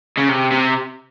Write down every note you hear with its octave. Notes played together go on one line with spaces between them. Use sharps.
C#3
C3
C3